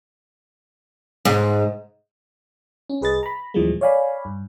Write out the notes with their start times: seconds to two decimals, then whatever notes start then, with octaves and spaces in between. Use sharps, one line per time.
1.25 G#2
2.90 C#4
3.01 C2 G#4 B4 D#5 A6
3.23 A#5 B5
3.54 D#2 A#2 E3 F3 G3 G#3
3.81 C#5 D5 F5 G#5 B5
4.25 G2